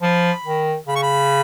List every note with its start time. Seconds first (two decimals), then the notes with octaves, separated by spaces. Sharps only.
0.02 F3 B5
0.45 D#3
0.87 C#3 B5
0.96 C#6
1.03 B5